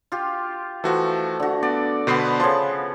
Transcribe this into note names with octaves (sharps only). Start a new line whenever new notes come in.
F4 G4
E3 F3 A3 F#4
D3 F#4
B3 D5
B2 D3 B3 B4 C5 C7
C#3 F3 A5 C6